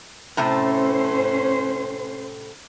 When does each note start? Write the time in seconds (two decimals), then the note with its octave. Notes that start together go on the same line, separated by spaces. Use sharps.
0.37 A2 C3 A3 C#4 C5